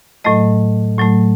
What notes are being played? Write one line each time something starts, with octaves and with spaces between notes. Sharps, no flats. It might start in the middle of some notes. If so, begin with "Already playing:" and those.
A2 F#3 A3 D#5
A2 F#3 A3